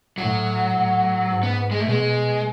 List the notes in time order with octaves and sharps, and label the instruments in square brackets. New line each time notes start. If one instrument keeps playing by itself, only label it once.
[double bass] A2 [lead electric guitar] F#3
[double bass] A2
G#2
[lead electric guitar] B3
G#3
A3
[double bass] B2 [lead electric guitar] G#3